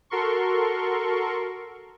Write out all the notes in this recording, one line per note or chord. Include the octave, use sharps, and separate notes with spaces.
F#4 A4 A#4 C6 C#6